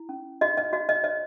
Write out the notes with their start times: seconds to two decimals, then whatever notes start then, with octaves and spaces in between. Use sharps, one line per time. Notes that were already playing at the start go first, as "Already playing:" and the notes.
Already playing: E4
0.09 C#4
0.41 F#4 D#5
0.57 D#5
0.73 F#4 D#5
0.89 D#5
1.04 C#5 D#5